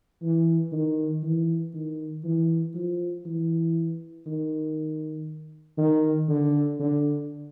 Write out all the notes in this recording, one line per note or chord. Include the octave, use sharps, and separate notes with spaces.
E3
D#3
E3
D#3
E3
F3
E3
D#3
D#3
D3
D3